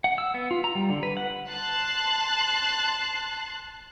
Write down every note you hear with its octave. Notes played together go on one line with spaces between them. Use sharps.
F#5
E6
B3
F4
A#5
G3
D3
B4
F#5
A5 C6 F#6